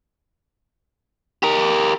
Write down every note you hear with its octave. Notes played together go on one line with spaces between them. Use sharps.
G4 A#4